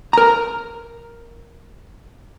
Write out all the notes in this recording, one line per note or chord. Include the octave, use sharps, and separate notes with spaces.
A#4 A#5